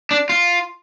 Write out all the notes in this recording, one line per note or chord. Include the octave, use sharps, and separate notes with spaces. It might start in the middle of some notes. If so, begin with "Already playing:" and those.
D4
F4